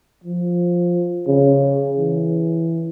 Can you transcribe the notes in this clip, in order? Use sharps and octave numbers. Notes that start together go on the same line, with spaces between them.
F3
C#3
E3